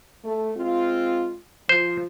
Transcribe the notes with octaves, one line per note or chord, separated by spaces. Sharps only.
A3
G#3 C4 F4
F3 F4 C5